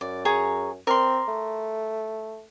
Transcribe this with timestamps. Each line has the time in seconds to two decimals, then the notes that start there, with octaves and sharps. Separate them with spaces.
0.01 F#2 D5
0.25 G#4 C#5 A#5
0.87 C4 A#4 D5 C6
1.28 A3